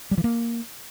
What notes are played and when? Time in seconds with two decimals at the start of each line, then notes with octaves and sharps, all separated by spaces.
0.11 G3
0.18 E3
0.24 A#3